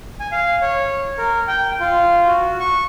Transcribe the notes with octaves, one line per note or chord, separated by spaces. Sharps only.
G#5
F5
C#5
A#4
G5
F4
F#4
C#6